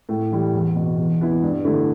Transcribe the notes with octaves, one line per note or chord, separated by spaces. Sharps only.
A2
E3 G3 E4
E2
B2 B3
E2
E3 B3 E4
G2
D3 A3 E4